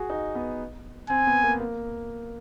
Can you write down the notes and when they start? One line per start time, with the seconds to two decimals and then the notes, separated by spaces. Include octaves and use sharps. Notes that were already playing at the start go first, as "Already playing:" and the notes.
Already playing: F#4 G#4
0.10 D#4
0.35 B3
1.09 C4 G#5
1.27 B3
1.44 A#3
1.60 A#3